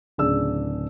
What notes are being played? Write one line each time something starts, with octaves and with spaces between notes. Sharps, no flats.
D1 C#3 D4 G#4 E6